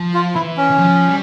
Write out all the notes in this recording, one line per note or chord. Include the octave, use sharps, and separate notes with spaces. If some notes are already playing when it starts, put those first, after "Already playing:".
Already playing: F3
F4
E3 E4
C#4
E3
F3
G3